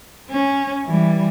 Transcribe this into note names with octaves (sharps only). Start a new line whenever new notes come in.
C#4
E3 G3